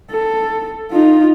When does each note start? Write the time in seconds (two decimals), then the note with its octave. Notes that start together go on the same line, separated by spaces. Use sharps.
0.11 A4
0.91 D#4 F4